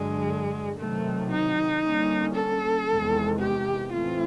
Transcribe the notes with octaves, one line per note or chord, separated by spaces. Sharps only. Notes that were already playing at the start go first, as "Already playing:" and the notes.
Already playing: G2 D3 F#3 G#3
C3 D#3 F#3 A3
D#4
D3 G3 A#3 C#4
A4
E2 C3 D#3 G#3
G4
A2 E3 A3 C4 F4